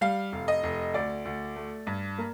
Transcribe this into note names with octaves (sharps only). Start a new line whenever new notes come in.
G3 F5
F1
D#5
F1
D2 D5
D2
A3
G2
A#3